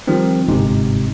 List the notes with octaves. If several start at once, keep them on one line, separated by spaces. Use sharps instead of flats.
D#3 F3 G3 C4
G1 G#2 C3 D#4